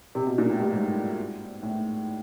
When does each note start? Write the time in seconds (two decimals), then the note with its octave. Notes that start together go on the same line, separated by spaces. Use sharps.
0.15 C3
0.27 B2
0.38 A#2
0.50 A2
0.60 G2
0.72 G#2
1.63 A2